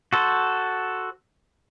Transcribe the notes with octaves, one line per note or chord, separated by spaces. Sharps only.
F#4 A4 C5